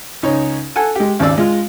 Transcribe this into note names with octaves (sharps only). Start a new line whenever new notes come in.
C#2 D#4 C#5
A4 F#5 G#5
G#3 G4
G#1 D#2 C#3 D5 E6
G#3 F4